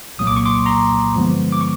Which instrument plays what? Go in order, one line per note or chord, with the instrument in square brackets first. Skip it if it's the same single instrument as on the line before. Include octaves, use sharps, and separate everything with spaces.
[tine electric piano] C2 A#2 F#3 A#3 D#6
D6
C#6
C6 D6
A#5 C6
G2 D3 F3 G#3 B3
D6
C#6